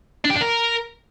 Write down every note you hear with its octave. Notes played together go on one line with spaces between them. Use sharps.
D4
G4
D4
A#4